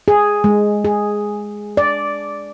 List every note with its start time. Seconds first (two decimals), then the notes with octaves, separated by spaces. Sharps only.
0.08 G#4
0.44 G#3
0.85 G#4
1.77 D5